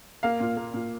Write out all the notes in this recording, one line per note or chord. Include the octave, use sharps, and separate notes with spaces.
A#3 F5
A#2
A#3
A#2